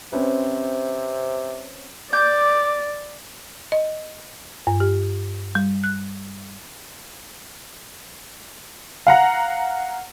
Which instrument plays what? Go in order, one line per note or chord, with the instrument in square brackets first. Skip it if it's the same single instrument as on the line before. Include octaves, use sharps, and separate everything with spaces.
[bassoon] C3 [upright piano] C4 C#4 B4
[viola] D5 [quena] D6 [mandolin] G6
[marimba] D#5
G2
G4
G3
F#6
[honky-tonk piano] F5 F#5 A#5